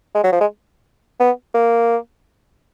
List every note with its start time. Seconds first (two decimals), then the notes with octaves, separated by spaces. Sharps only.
0.15 G#3
0.24 F#3
0.32 F3
0.41 G#3
1.20 B3
1.55 A#3